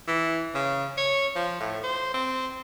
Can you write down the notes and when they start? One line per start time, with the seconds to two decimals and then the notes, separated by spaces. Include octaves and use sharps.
0.08 E3
0.55 C#3
0.97 C#5
1.36 F3
1.61 A2
1.83 C5
2.14 C4